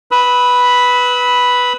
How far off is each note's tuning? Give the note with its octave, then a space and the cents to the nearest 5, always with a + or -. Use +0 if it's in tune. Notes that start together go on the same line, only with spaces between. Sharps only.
B4 +0 B5 +0 E6 -40